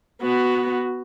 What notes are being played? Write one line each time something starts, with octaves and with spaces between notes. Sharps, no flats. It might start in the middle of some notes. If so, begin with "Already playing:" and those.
B3 F#4